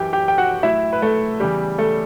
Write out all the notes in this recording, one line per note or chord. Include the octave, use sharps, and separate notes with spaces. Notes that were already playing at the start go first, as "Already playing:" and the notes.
Already playing: F#2 E3 G4 G5
G4 G5
G5
F#4 F#5
A2 F#3 E4 E5
B4
A3 A4
E2 C#3 E3 G3 G4
A3 A4